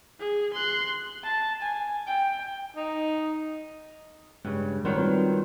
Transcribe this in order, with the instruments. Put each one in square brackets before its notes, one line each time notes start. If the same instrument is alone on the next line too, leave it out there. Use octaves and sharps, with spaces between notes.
[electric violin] G#4
C6 F#6
[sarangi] A5
G#5
G5
[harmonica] D#4
[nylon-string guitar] G2 C#3 [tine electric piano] G#3
[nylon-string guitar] D#3 F#3 C5 [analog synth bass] G3
[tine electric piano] C4 F4 B4